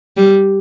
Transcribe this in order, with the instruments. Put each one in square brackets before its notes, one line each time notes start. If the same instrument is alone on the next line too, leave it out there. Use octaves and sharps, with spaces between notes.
[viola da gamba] G3